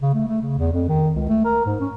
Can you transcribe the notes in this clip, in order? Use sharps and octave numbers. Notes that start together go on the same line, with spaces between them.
C#3
A3
A3
C#3
E2
F2
D#3
C#2
A3
A#4
G#2
C#4